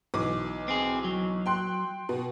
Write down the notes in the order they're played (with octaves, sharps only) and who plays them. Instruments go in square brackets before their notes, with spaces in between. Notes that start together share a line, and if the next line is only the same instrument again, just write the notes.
[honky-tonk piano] B1 E3 D6
[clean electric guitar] C4 G#4
F#3
[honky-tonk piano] G5 C6 F#6
B2